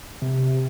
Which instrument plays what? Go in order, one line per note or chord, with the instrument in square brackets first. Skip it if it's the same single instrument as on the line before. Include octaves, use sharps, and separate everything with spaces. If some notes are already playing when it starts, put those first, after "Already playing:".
[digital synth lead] C3